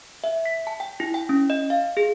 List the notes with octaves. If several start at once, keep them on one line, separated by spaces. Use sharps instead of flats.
E5
B6
A5
G5
E4
G5
C#4
D#5
F5
G#4